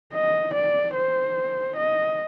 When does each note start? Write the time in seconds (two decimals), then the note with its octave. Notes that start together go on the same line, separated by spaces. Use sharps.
0.14 D#5
0.55 D5
0.95 C5
1.77 D#5